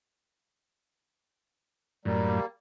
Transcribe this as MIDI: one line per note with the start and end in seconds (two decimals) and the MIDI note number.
2.05 2.40 42
2.05 2.40 45
2.05 2.46 55
2.05 2.46 58